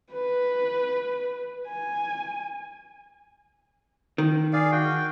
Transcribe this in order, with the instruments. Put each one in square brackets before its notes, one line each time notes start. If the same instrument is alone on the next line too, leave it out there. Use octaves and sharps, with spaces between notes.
[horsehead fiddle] B4
G#5
[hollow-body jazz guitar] D#3
[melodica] G#4 D5 F5
F#4 G5